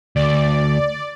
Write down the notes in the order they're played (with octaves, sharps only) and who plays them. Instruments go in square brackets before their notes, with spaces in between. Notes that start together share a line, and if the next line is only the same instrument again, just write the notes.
[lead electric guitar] D2 [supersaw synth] D5